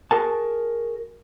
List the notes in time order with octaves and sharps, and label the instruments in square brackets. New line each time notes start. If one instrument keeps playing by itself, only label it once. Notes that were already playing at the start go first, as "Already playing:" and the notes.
[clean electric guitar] F#4 G#4 A#4 A5